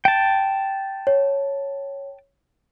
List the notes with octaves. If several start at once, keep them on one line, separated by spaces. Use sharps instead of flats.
G5 A5
C#5